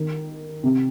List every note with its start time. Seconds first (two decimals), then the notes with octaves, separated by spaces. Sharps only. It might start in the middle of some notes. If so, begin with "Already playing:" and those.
Already playing: D#3
0.63 C3